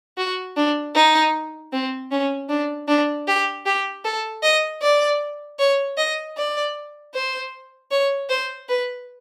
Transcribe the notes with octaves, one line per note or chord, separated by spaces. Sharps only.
F#4
D4
D#4
C4
C#4
D4
D4
G4
G4
A4
D#5
D5
C#5
D#5
D5
C5
C#5
C5
B4